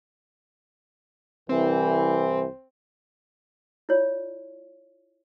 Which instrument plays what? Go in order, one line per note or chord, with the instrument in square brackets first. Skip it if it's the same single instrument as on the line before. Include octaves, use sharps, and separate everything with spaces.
[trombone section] C2 E3 [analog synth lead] C4
[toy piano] E4 F4 C#5 D5